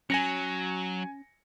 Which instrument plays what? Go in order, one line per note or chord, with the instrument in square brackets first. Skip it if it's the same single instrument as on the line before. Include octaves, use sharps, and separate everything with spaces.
[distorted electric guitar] F#3 [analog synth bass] C#4 [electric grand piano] G#5 A#6 C#7